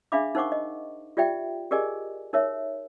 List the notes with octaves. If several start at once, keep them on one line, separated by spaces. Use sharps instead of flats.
D4 G#4 E5 F5 B5 D6
D#4 A#4 C5 F#5 C#6 D6
D#5
F4 G4 D5 E5 G5
G4 G#4 A#4 D5 D#5 G#5
D#4 A#4 C#5 E5